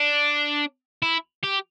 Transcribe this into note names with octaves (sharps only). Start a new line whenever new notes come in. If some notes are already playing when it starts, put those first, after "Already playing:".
Already playing: D4
E4
G4